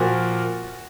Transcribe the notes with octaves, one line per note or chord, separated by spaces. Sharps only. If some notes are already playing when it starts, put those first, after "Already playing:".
Already playing: A#2 F3 A#3 F#4